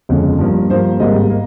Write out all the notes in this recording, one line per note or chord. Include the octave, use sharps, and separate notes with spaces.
G1 F2 C#3 G#3
G2 F3 A#3
G2 F3 A#3 C5
G#1 G#2 G3 A#3 D#5
A#3